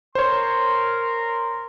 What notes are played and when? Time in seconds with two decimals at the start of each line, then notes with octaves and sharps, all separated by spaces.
0.15 A#4 C5 C#5 C6